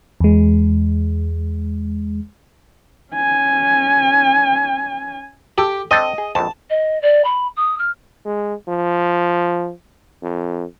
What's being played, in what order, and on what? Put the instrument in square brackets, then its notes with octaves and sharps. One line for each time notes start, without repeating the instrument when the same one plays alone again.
[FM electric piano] E2 G#3
[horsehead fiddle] C#4 G#5
[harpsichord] G4 [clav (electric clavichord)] A4
[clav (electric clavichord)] C4 D4 A4 [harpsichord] D#5
[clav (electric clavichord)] G#4
[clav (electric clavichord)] A#1 F2 [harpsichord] A5
[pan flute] D#5
D5
B5
D#6
F6
[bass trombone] G#3
F3
F2